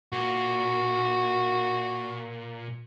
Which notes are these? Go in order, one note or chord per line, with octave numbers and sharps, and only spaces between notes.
A#2 F#4